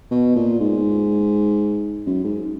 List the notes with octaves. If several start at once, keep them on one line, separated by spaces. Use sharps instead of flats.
B2
A#2
G#2
F#2
G#2